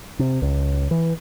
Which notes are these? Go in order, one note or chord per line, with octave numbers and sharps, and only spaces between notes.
C3
C#2
E3